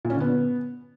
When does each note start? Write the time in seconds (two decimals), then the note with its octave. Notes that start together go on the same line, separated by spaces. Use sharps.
0.05 A#2
0.10 C#4
0.15 D3
0.20 B3